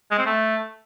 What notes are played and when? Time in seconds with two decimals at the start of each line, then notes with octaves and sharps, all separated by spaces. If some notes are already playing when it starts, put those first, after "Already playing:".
0.11 G#3
0.18 C4
0.26 A3